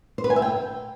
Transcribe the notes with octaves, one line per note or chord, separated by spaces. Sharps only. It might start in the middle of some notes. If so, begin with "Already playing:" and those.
C5
B4
G#5
E5
G5